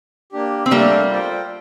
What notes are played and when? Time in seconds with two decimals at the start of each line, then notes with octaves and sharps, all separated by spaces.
0.32 A#3 D4 G4
0.66 C4
0.71 G3 A3 A#3 D4 A4
1.10 F4 A4 C5 G5